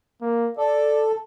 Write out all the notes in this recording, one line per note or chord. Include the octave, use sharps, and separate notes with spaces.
A#3
A4 D5